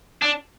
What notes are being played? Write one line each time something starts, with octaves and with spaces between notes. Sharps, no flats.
D4